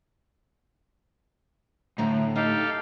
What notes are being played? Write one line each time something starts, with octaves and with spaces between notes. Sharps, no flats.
A2 D3 A3 A#5
D#4 G4 A4 F5